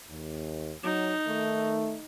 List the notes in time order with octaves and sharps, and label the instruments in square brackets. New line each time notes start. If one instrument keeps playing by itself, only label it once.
[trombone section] D#2
[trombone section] F#3 [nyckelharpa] D#4
[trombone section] D#3 A3